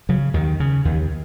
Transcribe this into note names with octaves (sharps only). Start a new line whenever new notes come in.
C#3 F#3
D#2 D#3
C#3
D#2